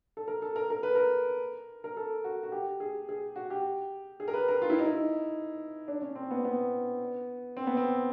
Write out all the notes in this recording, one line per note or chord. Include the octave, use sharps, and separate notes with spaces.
A4
A#4
A4
A#4
A#4
B4
A#4
A#4
A4
F#4
F#4
G4
G#4
G#4
F#4
G4
G#4
A#4
B4
A#4
F4
E4
D#4
E4
D4
C#4
C4
B3
B3
C4
B3
C4